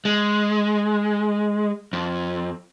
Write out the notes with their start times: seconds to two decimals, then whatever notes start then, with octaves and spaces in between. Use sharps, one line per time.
0.05 G#3
1.93 F2